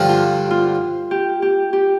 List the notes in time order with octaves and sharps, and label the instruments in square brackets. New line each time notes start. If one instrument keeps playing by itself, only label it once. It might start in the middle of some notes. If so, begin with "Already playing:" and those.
Already playing: [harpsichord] G2 D3 F3
[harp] F4
F4
G4
G4
G4